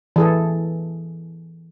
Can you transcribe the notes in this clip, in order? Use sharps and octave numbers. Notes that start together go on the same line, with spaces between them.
E3 G#4 A4